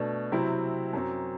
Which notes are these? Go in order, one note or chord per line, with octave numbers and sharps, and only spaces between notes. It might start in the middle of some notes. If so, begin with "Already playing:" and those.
Already playing: B2 A3 D4
C3 F#3 C4 E4
F#2 F#3 C4